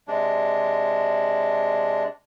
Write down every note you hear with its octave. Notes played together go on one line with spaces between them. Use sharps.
C3 G#3 D4